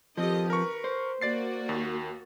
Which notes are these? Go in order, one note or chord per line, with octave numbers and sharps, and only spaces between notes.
D#3 F3 C4 G4 D#5
A#4 B4 C#6
C5
A#3 F#4 D5 A6 C7
D#2